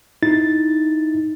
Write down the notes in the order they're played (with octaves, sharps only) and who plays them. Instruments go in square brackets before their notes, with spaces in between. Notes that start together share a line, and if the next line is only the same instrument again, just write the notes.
[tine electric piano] D#4 E4 A6